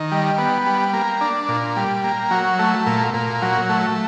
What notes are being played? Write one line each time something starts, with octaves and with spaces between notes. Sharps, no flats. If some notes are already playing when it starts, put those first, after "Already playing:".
Already playing: D#3
G3
B3
G3
A#3
D4
A#2
G3
A#3
F#3
A3
A#2
A#2
F#3
A3